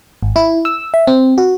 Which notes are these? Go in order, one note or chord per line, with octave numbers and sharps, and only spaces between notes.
G#1
E4
E6
E5
C4
F#4